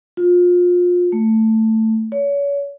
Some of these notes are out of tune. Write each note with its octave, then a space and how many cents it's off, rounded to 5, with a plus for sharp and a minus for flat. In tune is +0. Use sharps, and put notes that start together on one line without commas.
F4 +30
A3 +10
C#5 +35